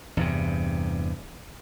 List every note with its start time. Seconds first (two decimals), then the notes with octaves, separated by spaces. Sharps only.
0.17 E2 G2 C3